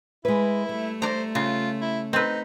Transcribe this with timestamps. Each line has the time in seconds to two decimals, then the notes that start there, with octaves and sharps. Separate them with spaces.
0.25 G#3 E4 B4
0.69 G3 A3
1.02 C5 D5 A#5
1.35 C#3 F4
1.82 E4
2.13 C4 D#4 B4